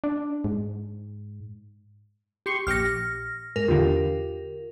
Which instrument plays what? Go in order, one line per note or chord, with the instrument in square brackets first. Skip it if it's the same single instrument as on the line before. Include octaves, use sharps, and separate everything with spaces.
[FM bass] D4
G#2
[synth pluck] G4 C6 C#6
[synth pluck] A#1 G4 C#7 [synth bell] F6 A#6
[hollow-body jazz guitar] G#2 [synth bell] A#4
[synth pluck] E2 D3 [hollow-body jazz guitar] F4 G4 F5